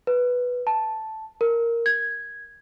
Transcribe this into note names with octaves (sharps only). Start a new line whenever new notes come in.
B4
A5
A#4
G#6